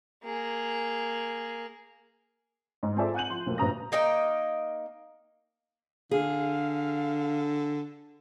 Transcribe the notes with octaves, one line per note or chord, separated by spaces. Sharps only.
A#3 G#4
G#2 G#3
C4 F4 G#4 A4 D5 E5
F#5 G#5 F#6 G6 D#7 F#7
F3 C6
B1 F2 A3 A#3
A#1 G2 B4 A#5 D#6 A#6
A#3 D#4 D#5 G5
D3 G#4 F5